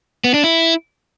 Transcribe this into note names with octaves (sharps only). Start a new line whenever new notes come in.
B3
D4
E4